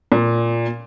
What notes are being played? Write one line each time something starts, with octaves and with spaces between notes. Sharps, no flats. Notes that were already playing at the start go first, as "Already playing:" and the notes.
A#2